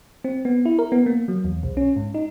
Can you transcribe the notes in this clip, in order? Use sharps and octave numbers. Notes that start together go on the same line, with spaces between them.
C4
B3
E4
A#4
B3
A#3
F#3
E2
B1
C#4
G#2
D#4